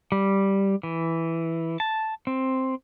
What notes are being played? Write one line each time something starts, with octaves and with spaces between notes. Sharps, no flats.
G3
E3
A5
C4